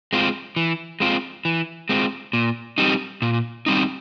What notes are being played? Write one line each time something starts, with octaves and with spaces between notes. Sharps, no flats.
G#3 C4 F4
E3
G#3 C4 F4
E3
G#3 C4 F4
A#2
G3 C4 D#4
A#2
G3 C4 D#4